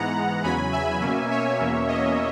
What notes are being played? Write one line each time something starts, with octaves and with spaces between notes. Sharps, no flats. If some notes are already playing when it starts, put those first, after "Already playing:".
Already playing: G#2 E3 G#3 B3 F#5 A#5
E2 C#3 F#3 G#5 B5
E5 G#5
B2 A#3 C#4
C#5 E5
E2 B2 A#3 C#4
D#5